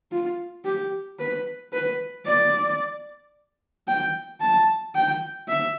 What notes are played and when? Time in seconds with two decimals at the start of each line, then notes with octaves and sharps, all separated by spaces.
0.12 F4
0.65 G4
1.20 B4
1.73 B4
2.26 D5
3.88 G5
4.41 A5
4.95 G5
5.48 E5